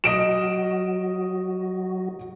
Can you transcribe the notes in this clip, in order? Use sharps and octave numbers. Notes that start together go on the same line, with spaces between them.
F#3 F#4 D#5 D7 E7